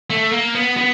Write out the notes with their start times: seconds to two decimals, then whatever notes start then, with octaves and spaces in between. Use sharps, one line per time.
0.10 A3
0.32 A#3
0.55 B3
0.77 B3